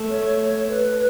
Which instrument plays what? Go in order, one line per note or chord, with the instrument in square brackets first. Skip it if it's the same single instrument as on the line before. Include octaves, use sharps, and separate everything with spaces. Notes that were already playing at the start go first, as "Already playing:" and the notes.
Already playing: [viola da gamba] A3
[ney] C#5
B4